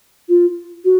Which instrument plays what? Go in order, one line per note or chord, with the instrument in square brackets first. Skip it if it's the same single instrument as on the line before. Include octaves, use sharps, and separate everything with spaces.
[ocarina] F4
F#4